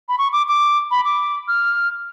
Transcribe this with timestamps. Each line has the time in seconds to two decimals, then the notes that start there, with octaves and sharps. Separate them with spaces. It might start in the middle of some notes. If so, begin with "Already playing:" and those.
0.09 B5
0.18 C#6
0.33 D6
0.48 D6
0.91 B5
1.05 D6
1.48 F6